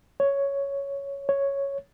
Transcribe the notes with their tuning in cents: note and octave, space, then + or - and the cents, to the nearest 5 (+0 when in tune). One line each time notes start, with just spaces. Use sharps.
C#5 +5
C#5 +0